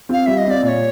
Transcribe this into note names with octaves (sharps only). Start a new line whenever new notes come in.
C4 F4 F5
G3 E5
D#5
C4 F4 D5
A#2 D5
C#5